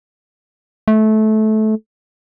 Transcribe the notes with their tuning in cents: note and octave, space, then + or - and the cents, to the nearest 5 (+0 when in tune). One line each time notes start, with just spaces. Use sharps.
A3 -20